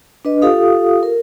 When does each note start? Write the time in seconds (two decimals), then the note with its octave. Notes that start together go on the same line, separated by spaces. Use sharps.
0.25 D4 B4 D#5
0.42 F4 G4 A4 F5 D#6
1.03 A#4